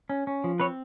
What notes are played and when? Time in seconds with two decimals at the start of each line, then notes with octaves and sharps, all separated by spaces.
0.09 C#4
0.27 C#4
0.44 F3
0.60 C4 B4 C#5